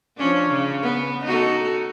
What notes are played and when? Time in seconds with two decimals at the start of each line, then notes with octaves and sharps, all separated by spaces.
0.17 F3 C#4 D4
0.50 C#3
0.82 B3
1.24 D#4 F#4 A4